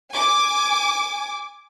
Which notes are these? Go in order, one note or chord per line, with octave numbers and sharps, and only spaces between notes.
G#5 D6